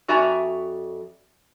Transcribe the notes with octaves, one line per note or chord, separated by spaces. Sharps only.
F2 F#4 D5 E5 G#5 A#5